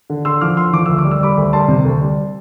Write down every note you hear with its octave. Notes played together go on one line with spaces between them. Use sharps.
D3
D3 C6 E6
F3 D6 F6
D3 C6 E6
F3 D6
D2 E6
D6
G3
E6
G3 B5 D6
D2
G3 A5 C6
C3
D2
G3